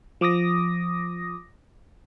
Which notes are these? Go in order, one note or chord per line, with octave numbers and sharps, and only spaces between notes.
F3 D6 D#6 A#6